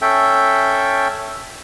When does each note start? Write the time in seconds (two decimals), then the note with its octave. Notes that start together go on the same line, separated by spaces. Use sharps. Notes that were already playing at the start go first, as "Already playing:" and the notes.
0.02 C#4 A4 E5 G5